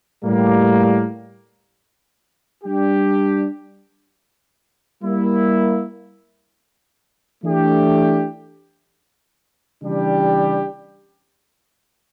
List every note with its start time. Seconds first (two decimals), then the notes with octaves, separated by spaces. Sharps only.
0.24 A2 G3 A#3
2.63 G3 D4 G4
5.03 G3 A#3 E4
7.43 E3 A3 D4 G4
9.83 C#3 E3 G3 D4 G4